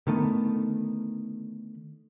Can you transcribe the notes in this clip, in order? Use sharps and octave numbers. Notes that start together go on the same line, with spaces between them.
D3 D#3 A3 B3